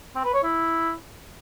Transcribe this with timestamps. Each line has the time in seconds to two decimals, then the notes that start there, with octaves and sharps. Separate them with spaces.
0.15 C4
0.25 B4
0.34 C#5
0.43 E4